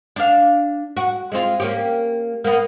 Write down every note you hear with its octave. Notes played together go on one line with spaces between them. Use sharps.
D4 F5
F#4
G#3 C4 F4
A#3 C#4 G4
A#3 B3